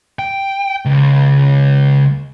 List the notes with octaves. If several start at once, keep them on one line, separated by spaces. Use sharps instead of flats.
G5
C#2